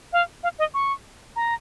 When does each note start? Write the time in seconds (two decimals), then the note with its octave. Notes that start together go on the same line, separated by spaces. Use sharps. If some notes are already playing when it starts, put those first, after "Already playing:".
0.13 F5
0.43 F5
0.59 D#5
0.74 C#6
1.36 A#5